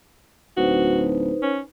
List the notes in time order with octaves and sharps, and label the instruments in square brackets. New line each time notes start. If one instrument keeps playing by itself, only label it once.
[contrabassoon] D1 [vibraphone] D#4 B4 C5 [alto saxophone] F#4
[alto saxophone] C#4